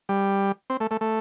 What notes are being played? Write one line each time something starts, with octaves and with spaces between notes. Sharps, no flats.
G3
C4
A3
A3
A3